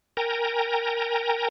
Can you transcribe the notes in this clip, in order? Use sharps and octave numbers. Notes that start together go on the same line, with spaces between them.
A#4 G5 G#5 A#5